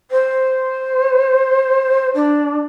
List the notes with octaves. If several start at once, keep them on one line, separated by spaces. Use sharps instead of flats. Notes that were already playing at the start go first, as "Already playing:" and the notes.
C5
D4